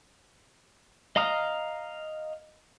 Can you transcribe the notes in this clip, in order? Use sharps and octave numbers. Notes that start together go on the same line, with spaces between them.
D#5 F5 A#5 D#6 F6